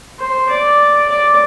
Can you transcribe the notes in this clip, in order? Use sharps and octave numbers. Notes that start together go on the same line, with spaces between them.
C5
D5
D5